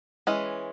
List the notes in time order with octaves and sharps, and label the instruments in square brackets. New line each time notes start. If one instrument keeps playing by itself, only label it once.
[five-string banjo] E3 G#3 C#4